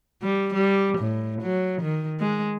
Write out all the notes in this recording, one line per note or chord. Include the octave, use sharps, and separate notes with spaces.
G3
G3
A2
F#3
D#3
G#3